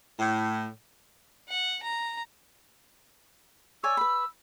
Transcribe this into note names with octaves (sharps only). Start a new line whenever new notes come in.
A2
F#5
A#5
C#5 D5 G#5 E6
B4 B5